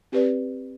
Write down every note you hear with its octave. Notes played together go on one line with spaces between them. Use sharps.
C4 G4 B4 D5